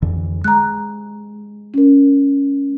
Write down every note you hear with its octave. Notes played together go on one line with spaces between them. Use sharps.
F2 D3 E3
G#3 A#5 F#6
C#4 A#4